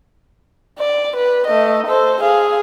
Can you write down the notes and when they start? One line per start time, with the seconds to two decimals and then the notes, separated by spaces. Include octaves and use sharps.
0.79 D5
1.16 B4
1.47 A3 D#5
1.87 A4 C5
2.21 G#4 F5